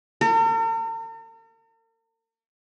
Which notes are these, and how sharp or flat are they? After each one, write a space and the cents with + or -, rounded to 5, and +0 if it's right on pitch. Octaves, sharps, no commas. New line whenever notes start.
A#4 -45